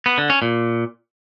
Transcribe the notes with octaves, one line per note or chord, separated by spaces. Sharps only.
B3
D3
C#4
A#2